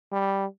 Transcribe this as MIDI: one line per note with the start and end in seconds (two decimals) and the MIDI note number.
0.12 0.46 55